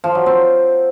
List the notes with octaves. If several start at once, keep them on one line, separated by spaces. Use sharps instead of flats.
F3
F#3
C4